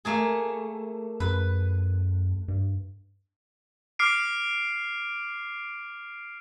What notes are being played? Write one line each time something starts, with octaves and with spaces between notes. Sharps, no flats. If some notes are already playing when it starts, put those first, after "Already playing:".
A3 A#3 G#4
F#2 B4
G2
D6 F6 C7 D7